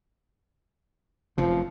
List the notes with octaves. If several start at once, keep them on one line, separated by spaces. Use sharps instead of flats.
F1 F#2 C3 F3